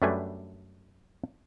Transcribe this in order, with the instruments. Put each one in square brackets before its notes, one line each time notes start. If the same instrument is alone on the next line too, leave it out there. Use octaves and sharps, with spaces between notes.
[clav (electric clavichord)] F#2 G3 A3 D4 B4 G#5